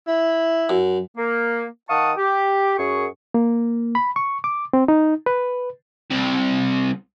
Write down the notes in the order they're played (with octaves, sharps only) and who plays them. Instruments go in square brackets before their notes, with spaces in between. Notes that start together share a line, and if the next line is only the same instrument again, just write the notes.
[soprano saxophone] E4
[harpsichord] F#2
[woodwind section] A#3
D#3 F5 F#5 A5 C#6 D#6
G4
F#2 G#4 C#6
[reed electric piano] A#3
B5
C#6
D6
C4
D#4
B4
[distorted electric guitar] C2 C3